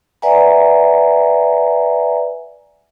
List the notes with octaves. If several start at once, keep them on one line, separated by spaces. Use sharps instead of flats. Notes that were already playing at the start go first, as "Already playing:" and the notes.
B4 D5 E5 F#5 G#5 A#5